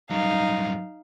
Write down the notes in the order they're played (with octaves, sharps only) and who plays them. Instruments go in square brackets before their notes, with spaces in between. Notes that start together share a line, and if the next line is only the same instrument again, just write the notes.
[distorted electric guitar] G2 F#3 [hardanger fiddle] D#4 F5